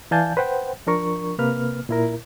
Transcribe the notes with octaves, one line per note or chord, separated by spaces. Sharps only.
E3 D5 F5 G#5 A5 G6
B4 C5 F#5 G5
F3 D4 A#4 C#6
C3 A#3 B4 F6
A#2 E4 A#4